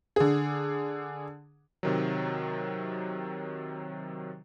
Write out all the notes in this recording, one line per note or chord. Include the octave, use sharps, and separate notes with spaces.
D3 G#4
C3 D#3 F#3